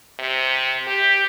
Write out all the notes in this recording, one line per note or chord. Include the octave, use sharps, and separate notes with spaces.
C3
G4